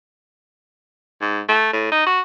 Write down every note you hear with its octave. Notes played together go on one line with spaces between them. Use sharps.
G#2
A3
A2
D#4
F#4